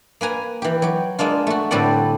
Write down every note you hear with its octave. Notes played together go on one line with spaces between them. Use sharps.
A#3 B4 G#5 A#5
E3 G4
F#3 G4
G#3 A#3 D4 F4
A3 F#4
A2 D3 G3 C4 D5 F#5